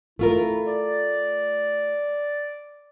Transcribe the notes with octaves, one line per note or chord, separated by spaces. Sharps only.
A3 E4 F4 A#4
D5